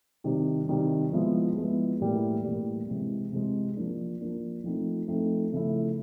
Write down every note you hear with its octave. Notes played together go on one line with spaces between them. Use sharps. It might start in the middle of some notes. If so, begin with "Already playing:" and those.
C3 D#3 G3
C3 D#3 G3
F3 G#3 B3 E4
F3 G#3 B3 E4
A2 E3 G3 A#3
A2 E3 G3 A#3
C3 E3 G#3
C3 E3 G#3
F3 A#3 D4
F3 A#3 D4
F3 A3 C4 D#4
F3 A3 C4 D#4
C#3 F3 A3 C#4 E4